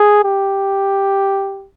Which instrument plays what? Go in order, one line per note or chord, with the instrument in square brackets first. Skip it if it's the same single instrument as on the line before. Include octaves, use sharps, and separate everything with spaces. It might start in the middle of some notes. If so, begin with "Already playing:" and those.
Already playing: [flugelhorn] G#4
G4